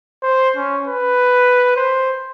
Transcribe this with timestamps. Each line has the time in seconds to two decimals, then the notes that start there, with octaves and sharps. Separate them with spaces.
0.23 C5
0.56 C#4
0.87 B4
1.76 C5